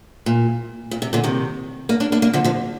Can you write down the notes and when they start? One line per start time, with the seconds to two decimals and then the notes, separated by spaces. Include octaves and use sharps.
0.26 A#2
0.91 A#2
1.02 C3
1.13 A#2 D3
1.24 C3 D#3
1.89 A#3 D4
2.00 A#3 D4
2.12 A#3 D4
2.22 A#3 D4
2.33 D3 F3
2.44 D3 F3